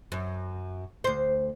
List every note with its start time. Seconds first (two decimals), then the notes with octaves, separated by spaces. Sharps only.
0.12 F#2
1.04 D2 C5